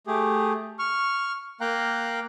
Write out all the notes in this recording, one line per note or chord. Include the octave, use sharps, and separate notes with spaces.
A3 G4 G#4
C#6 F6
A#3 F5 G5 A#5 F#6